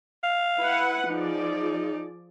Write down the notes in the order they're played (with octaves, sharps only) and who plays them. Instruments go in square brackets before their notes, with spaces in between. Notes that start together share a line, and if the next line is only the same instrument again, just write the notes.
[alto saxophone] F5
[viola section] E4 B4 F#5
[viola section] F3 G#4 D5 [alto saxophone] D#4